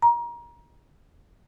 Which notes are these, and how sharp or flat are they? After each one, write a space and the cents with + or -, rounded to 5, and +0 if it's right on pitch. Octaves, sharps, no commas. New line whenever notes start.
A#5 +25